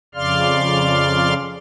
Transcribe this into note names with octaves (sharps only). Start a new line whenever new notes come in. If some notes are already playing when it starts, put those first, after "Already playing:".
F2 C#3 D5 F5 C6 F6